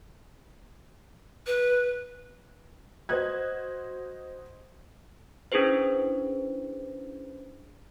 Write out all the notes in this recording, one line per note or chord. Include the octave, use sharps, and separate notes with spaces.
B4
F#4 C5 D#5 F#6 G#6
C#4 D4 E4 G#4 B4 C5